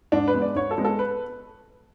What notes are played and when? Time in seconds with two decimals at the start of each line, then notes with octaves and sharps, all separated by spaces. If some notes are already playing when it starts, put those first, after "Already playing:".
0.12 G#2 D4
0.28 B4
0.34 G#3 B3
0.42 D5
0.55 G#2 C#5
0.71 A4
0.78 G#3 B3
0.85 A4
0.99 B4